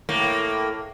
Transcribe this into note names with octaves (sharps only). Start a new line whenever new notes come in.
A2 A#3